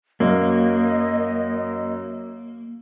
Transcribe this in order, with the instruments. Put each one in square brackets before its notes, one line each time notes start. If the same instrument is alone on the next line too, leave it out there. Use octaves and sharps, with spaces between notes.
[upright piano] F#2 [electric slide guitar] A#3 [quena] D#5